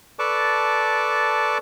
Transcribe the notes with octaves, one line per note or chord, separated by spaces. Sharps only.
A4 B4 D5 A5 C#6 D6